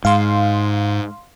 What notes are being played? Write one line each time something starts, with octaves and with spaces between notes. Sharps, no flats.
G#2 F5 C6